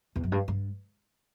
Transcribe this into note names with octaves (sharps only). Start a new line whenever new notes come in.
E2
F#2
G2
G2